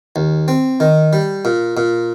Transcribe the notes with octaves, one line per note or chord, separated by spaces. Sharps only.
D#2
C4
D#3
G3
A#2
A#2